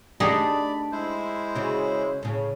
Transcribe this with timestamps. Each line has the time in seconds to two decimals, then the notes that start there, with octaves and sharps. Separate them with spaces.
0.20 A3 D4 D#4 G4 G#4 D5 B5
0.92 G#3 E4 C5
1.55 C#3 F#4
2.23 A2 C#3